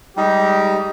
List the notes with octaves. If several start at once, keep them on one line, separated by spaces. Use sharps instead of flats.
G3 G#3 D#4 G4